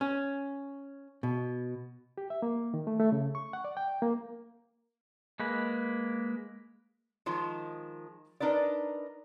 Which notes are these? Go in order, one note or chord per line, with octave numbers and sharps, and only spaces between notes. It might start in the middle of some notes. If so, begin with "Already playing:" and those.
C#4
B2
G4
E5
A#3
D#3
A3
A3
C#3
C#6
F#5
D5
G5
A#3
G#3 A#3 B4
D#3 F3 G#3
D4 D#4 A#4 B4 D5